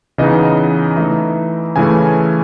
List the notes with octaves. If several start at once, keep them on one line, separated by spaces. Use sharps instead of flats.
C#3 E3 B3 D#4 D#5
E3 A3 D#4 E5
C#3 E3 A3 C#4 G#5